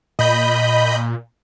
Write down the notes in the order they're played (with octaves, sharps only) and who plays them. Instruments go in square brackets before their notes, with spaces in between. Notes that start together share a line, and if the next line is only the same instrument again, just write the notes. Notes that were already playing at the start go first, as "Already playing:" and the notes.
[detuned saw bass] A#2 [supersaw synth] D#5 B5 G6